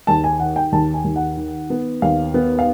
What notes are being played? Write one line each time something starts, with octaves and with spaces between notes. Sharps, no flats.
D#2 A5
G#5
D#3 F#5
G5
D#2 A5
G#5
D#2
F#5
D#3
B3
D#2 F5
B3
F5